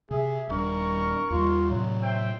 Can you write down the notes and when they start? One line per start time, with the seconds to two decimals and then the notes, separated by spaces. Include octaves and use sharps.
0.11 C3 G#4 E5
0.49 D#1 G3 D4 A#4 C#6
1.30 D#2 G3 F4
1.70 A2 C3 F#3
2.02 C5 E5 G5